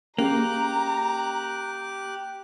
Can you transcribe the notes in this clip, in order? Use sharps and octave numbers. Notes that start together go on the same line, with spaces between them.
A#3 C#4 G4 G#4 A#5 F#6